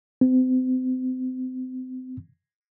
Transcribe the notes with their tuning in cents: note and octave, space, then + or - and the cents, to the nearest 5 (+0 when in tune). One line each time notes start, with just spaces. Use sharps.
C4 -35